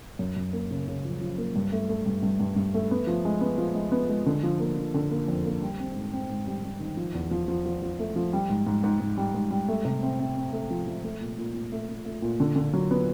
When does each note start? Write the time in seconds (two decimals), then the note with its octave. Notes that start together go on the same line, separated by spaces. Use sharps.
0.19 F#2
0.36 F#2
0.53 A#3
0.71 C#3
0.88 C#3
1.05 F3
1.21 F3
1.38 A#3
1.56 G2
1.72 A3
1.89 A3
2.06 G2
2.23 G2
2.40 G2
2.56 G2
2.74 A3
2.91 B3
3.07 F3
3.25 G#3
3.41 B3
3.58 F3
3.75 G#3
3.92 B3
4.09 G#3
4.26 D3
4.43 F3
4.60 A#3
4.77 F3
4.94 D3
5.11 A#3
5.28 F2
5.45 A#3
5.62 G3
5.79 C4
5.96 G#2
6.13 C4
6.29 G#2
6.47 G3
6.64 G3
6.80 D#3
6.97 F3
7.14 E2
7.31 F3
7.48 F3
7.66 F3
7.83 F3
7.99 A3
8.16 F3
8.33 G3
8.49 G#2
8.67 G#2
8.84 G#2
9.00 G#2
9.18 G3
9.34 G#2
9.51 G3
9.68 A3
9.85 C3
10.03 C4
10.20 C4
10.37 C4
10.52 A3
10.71 F3
10.87 F3
11.04 A3
11.21 A#2
11.38 A#2
11.54 A#2
11.72 A3
11.89 A3
12.06 A3
12.22 A#2
12.40 D3
12.56 D3
12.73 F#3
12.91 B3